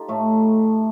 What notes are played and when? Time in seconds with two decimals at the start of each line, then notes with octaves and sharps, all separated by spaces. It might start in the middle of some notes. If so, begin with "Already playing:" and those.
Already playing: D#4 F4 G4 A4
0.08 A2 A3